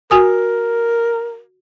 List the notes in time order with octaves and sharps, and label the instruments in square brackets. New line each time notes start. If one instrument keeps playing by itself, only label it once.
[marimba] F#4 G#5 D#6 [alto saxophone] A#4